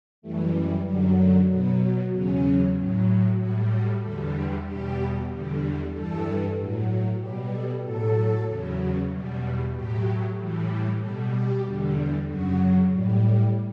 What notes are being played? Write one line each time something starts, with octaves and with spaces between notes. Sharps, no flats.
F#2 E3 G3 A3
F#2 D3 F#3 G3
A3
B2 F#3 B3
E2 C#3 F#3 C#4
A2 F#3
A2 G3 F#4
F#4
E2 D3 G3 A4
G4
E2 B2 G3 G4
E2 D3 G3
G2 E3 G3 A4
A2 F#3
B2 G3 G4
A4
A2 F#3 A4
E2 C#3 F#3
E2 B2 G3
A2 F#3 G4
A2 E3 G3
B2 G3 A4
G4
E2 D3 G3
F#2 C#3 F#3 F#4
A2 G3